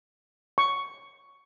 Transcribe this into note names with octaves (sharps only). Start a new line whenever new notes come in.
C#6